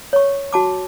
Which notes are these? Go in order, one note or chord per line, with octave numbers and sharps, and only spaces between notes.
C#5 C#6
F#4 A5 D6